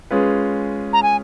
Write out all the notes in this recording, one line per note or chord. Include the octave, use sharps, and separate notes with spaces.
G#3 C#4 F4 G#4 B4
A#5
G#5